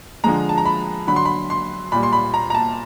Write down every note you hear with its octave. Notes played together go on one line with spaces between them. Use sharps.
D3 F3 G#3 A#5
A5
A#5
B5
D3 F#3 B5
C6
B5
C6
A#2 G3 B5
C6
B5
A#5
A#5
A5